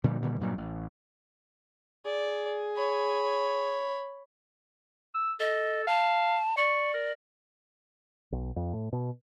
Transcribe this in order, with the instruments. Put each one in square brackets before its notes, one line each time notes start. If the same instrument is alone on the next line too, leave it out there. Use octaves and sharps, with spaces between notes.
[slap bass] A#2 D3 F3 G3
A#2 D3 D#3 G3
G2 A#2 F#3 G3
A1
[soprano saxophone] G#4 [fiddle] D5
[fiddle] C#5 B5
[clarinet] E6
[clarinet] A4 [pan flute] D#5
[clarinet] F5 [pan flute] A5
[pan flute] D5 [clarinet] C#6
[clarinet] A#4
[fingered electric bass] B1
F2
A2
B2